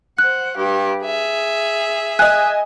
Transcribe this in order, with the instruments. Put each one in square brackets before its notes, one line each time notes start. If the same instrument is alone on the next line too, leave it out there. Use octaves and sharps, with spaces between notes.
[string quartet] C5 F#5 [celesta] F#6
[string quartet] G2 G4
G#4 E5
[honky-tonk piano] D#5 G#5 [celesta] F#6